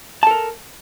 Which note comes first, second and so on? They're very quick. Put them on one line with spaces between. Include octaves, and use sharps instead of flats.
A5 A4 A#4